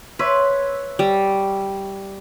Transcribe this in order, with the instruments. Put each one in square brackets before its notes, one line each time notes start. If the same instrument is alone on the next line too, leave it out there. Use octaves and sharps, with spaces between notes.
[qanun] B4 [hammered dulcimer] C#5 E5 C6
[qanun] G3